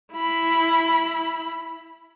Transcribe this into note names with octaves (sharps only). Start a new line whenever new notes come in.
E4 B5